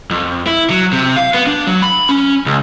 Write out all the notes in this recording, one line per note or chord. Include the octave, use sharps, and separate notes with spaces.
F2
E4
F#3
C3
F5
B3
D4
F#3
B5
C#4
C#2